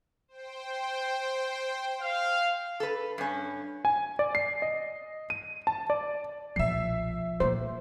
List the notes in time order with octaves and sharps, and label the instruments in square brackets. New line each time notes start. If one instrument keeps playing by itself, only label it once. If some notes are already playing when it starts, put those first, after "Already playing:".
[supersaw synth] C5 G5
[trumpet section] F5
[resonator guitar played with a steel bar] A4 B4
G2 C#4
[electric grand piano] G#5
D5
C7
D#5
D#7
A5
D5
[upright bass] B1 A#2 [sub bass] F3 [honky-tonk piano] E5 C7
[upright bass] A#2 A#3 [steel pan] C5